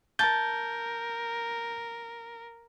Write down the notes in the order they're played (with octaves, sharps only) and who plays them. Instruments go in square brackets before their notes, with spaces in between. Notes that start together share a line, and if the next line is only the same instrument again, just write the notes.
[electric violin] A#4 [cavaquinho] A5 [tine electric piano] G6